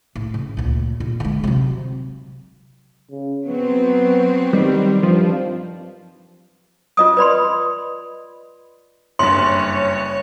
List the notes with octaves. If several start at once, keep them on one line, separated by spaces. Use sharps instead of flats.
A2
C#3
D2 A#2
A#2
D3 G#3
C3 F#3
C#3
F#3 B3 C4
D#3 G3
G2 F3
F4 D#5 D#6
B4 D5 B5 C6
F#1 G2 C#5 C6